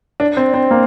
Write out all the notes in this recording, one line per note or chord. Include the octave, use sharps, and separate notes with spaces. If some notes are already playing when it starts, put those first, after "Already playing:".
D4
C4
C4
A#3